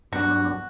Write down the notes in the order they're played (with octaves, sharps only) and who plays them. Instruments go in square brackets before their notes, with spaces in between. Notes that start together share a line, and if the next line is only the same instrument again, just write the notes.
[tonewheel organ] G2 F#3 B3 D4 [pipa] F#4